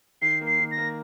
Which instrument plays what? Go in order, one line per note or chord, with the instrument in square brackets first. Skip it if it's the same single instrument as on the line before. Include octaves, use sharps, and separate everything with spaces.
[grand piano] D#3 [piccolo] C7
[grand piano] A#3
[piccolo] C7
[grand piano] D#3
[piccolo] A#6
[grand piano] A#3